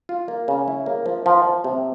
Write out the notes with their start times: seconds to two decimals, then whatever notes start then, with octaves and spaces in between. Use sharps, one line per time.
0.09 F4
0.28 A#3
0.48 C#3
0.68 E4
0.86 A#3
1.06 F3
1.26 F3
1.45 F3
1.64 C3